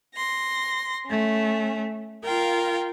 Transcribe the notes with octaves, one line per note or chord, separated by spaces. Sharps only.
C6 A#6
A3 C#4
F4 A#4 F5 G5